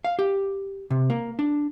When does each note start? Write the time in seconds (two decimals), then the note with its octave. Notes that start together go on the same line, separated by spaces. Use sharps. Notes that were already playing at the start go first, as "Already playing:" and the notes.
0.04 F5
0.19 G4
0.90 C3
1.10 A#3
1.39 D4